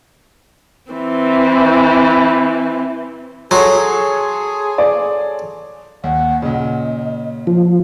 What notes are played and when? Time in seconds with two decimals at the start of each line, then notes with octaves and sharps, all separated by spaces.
0.91 E3 C4
3.51 F#3 G#4 A4 C#5 C6
4.78 D5
6.04 D#2 F#5
6.42 A#2 C#3 D#5
7.47 F3